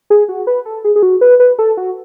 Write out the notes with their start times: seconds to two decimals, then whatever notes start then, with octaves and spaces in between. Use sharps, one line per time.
0.10 G#4
0.29 F#4
0.47 B4
0.65 A4
0.84 G#4
0.96 G#4
1.03 F#4
1.21 B4
1.40 B4
1.59 A4
1.77 F#4